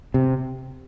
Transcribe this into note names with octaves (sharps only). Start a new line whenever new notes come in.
C3